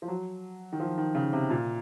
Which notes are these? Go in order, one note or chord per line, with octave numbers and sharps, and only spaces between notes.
F3
F#3
D#3
F3
D#3
C#3
C3
A#2